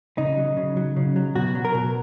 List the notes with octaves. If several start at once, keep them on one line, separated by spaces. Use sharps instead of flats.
C#3 D#4
F#3
C#3
F#3
C#3
F#3
B2 F#4
F#3
A#4
B2